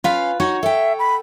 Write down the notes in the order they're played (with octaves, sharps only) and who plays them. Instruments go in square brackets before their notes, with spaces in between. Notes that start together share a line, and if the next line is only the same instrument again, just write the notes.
[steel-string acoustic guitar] C#4 F5 [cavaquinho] F4 B4 B5
[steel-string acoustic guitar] D#4 F#4 F#5 [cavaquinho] C#5
[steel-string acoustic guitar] A4 G5 [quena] E5
[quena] B5